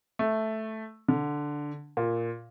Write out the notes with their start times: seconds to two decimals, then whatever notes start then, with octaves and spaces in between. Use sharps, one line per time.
0.19 A3
1.08 D3
1.97 A#2